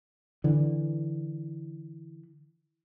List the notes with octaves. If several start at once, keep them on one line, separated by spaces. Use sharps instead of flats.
D3 E3